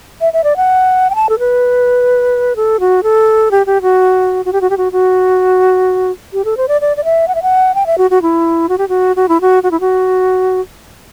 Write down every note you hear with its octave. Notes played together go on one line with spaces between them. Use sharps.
E5
E5
D5
F#5
G5
A5
A4
B4
A4
F#4
A4
G4
G4
F#4
F#4
G4
F#4
G4
F#4
F#4
G4
A4
C5
D5
D5
D5
E5
F#5
E5
F#5
G5
E5
F#4
F#4
E4
F#4
G4
F#4
F#4
E4
F#4
F#4
E4
F#4